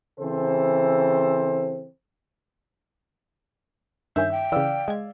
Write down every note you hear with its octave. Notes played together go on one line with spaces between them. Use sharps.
C#3 E3 C4 A4 C5
G2 D#3 C#4 E5 G6
G5
C#3 E3 D5 F5 E6
G#3 G#6